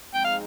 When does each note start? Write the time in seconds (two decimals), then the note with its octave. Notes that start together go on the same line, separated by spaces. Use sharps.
0.14 F3 G#3 C4 D#4 G5
0.24 F5